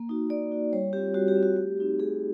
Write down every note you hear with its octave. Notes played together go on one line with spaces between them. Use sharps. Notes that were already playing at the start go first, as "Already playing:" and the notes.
Already playing: A#3
D#4 F#4
A#3 D5
D#4 F#4
G3 C#5
C4 F4 G4
G3 F#4
G4
C4 F4
F#4
A3 G4
C4 D#4 F#4
A3 G#4